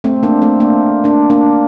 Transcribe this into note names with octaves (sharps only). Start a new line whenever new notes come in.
A3 C4
A#3 D4
A3 C4
A#3 D4
A#3 D4
A#3 D4